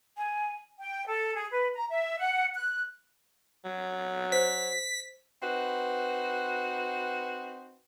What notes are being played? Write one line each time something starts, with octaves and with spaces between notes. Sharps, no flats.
G#5
G5
A4
G#4
B4
A#5
E5
F#5
F#6
F#3
C5 B6
C4 D#4 F#4 B4